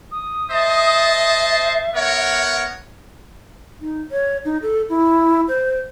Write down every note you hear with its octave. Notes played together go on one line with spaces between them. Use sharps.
D#6
C5 D#5 E5 A5
C7
B3 A#4 C#5 F#5
D#4
C#5
D#4
A4
E4
C5